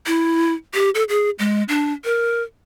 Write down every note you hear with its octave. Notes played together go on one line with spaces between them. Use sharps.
E4
G4
A4
G#4
G#3
D4
A#4